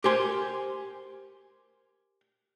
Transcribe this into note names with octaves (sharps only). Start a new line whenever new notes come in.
G4 A#4 C5 G#5 C6